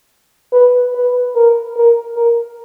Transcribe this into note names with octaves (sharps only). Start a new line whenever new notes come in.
B4
B4
A#4
A#4
A#4